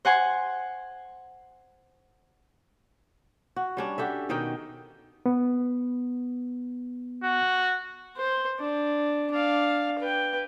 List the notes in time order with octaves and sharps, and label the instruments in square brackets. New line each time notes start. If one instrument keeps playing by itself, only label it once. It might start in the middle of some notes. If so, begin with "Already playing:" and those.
[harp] C5 F#5 G#5 C6
[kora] F#4
G3 C#4 D4
F#4 G4 A4 E5
B2 D#3 D#4 G5
[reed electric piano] B3
[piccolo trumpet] F#4
[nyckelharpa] C5
D4
D4 F5
B4 G5